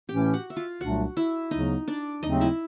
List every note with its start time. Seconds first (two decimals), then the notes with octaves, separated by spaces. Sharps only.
0.09 A2 E3 A3 C#4 G4 G5
0.33 F#4 F#5
0.50 E5
0.56 F4 F5
0.81 C2 A#2 F#3 A3 D4 F#4 F#5
1.17 E4 E5
1.51 D2 C#3 F#3 B3 D#4 D#5
1.88 D4 D5
2.23 D#2 C#3 F#3 A3 C4 D#4 D#5
2.40 E4 E5